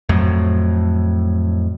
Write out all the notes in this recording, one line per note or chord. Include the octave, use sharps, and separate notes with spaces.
F2 A2 F#3